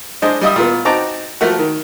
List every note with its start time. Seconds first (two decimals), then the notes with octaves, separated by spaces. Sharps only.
0.22 G#3 D4 C5 D#5
0.41 G3 D#5 E5 D#6
0.56 A#2 B3
0.85 C4 D#4 F#4 A5 A#5 D6
1.41 F3 A3 A#3 F#4
1.59 D#3